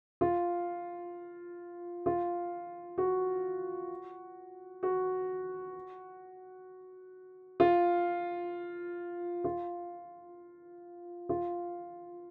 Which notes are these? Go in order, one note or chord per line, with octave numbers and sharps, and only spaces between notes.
F4
F4
F#4
F#4
F4
F4
F4